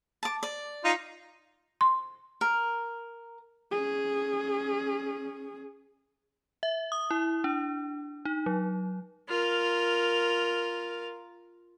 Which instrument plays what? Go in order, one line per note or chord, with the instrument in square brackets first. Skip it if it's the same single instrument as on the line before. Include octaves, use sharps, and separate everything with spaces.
[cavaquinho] A5 D6
D5
[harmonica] D#4 F4
[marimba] C6
[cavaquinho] A#4
[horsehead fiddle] C#4 G#4
[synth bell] E5
D#6
E4
D4
D#4
F#3
[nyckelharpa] F4 A#4